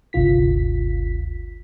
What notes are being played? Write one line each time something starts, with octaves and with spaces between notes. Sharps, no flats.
G1 D2 C3 F4 B6